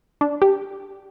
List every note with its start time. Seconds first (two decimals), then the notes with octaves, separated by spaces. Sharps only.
0.21 D4
0.42 G4